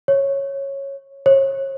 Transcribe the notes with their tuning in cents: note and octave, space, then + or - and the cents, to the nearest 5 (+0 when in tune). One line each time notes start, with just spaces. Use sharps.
C#5 -10
C#5 -35